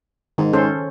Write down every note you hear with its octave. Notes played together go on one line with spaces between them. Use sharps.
G#2 D#3
C#4 A4 C5